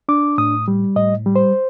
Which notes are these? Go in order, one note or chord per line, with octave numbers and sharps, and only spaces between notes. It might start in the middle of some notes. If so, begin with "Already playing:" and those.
D4 D6
A2 D#6
G3
A2 D#5
G3
C5